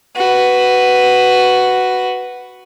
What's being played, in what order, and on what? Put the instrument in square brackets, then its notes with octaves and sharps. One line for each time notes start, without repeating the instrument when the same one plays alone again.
[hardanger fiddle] F#4 B4